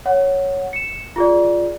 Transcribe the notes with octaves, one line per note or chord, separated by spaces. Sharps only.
C#5 F#5
C#7 E7
F4 G#4 D5